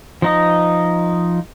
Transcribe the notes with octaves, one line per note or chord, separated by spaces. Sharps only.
F3 D#4 D#5